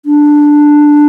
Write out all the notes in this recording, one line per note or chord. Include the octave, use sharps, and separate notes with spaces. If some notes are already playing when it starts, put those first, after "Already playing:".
D4